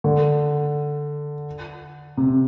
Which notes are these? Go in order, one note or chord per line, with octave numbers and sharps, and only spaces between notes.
D3
C3